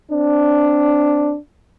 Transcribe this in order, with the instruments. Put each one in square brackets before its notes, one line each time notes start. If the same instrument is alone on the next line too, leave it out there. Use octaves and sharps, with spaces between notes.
[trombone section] C4 D4